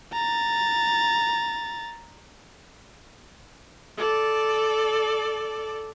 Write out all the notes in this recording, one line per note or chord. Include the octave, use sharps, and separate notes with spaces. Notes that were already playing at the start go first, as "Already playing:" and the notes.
A#5 A6
A4 D5